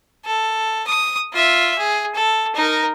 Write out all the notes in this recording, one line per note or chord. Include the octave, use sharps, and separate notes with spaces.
A4
D#6
F4 E5
G#4
A4
D#4 A#4